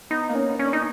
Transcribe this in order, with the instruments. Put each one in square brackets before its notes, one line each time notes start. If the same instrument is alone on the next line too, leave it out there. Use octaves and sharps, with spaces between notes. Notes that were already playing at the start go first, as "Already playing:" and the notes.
[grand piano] B3 [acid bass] D#4
[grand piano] A#3
[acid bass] C#4
[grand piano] B3
[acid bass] C#4
[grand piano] D4
[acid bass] D#4